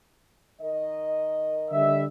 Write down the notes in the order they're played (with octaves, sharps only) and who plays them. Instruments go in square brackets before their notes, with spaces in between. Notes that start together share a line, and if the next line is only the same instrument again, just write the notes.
[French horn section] D#3 A#4 D#5
[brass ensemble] D3 G3 E5